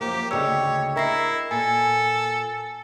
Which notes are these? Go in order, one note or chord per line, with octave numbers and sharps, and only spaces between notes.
F#2 F3 A#3 G4
D2 C#3 C#5 D#5 G5 E6
E4 A#4 D#5 E5 A#6 C7
A#2 A4 G#5